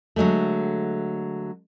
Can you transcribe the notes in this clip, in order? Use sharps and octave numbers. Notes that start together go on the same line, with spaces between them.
D3 F#3 G#3 A3